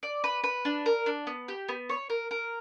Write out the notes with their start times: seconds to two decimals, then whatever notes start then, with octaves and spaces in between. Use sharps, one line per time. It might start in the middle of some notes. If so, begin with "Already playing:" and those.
0.03 D5
0.24 B4
0.44 B4
0.65 D4
0.86 A#4
1.06 D4
1.27 B3
1.48 G4
1.69 B3
1.89 C#5
2.10 A#4
2.31 A#4